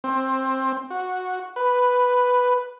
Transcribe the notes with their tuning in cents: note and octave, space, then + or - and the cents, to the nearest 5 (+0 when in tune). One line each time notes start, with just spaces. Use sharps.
C4 +15
F#4 -10
B4 +5